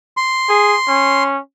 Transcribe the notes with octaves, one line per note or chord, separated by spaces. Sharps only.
C6
G#4
C#4